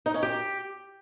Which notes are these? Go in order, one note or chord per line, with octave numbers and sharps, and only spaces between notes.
D#4
C#4
G4